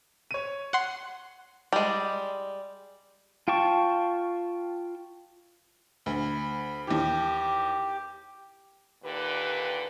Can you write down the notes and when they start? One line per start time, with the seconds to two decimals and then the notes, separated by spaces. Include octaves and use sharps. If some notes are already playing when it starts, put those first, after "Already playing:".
0.31 C#5 D#7
0.73 F#5 C6
1.73 G3 G#3
3.48 F4 G5 A5 C#6
6.06 D2 B5
6.87 D#2 E3 G4
9.04 A#2 D3 D#3 G4 B4